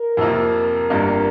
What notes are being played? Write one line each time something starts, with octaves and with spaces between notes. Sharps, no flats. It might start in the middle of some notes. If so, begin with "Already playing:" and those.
Already playing: A#4
F2 C3 F3 A#3 F4
G1 G2 G3 A#3 F4